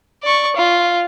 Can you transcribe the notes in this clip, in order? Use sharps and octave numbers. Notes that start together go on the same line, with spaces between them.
D5 C#6
F4